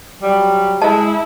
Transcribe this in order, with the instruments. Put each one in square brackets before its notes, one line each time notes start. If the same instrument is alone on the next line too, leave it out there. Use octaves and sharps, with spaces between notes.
[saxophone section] F#3 G3
[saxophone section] G#3 [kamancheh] E4 [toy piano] D#5 A5